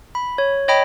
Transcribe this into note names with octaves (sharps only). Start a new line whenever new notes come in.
B5
C#5
C#5 D#5 G5 B5